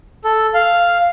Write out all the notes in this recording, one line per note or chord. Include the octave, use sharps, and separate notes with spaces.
A4
F5